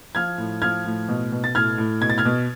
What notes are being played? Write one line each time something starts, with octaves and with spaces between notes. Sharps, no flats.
F3 F6 G#6
A2
F3 F6 G#6
A2
B2
B2
A6
A2 F6 G#6
A2
B2 G#6
A6
F6 G#6
B2